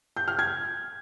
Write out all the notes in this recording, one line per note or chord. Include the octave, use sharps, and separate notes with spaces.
G6
F6
G#6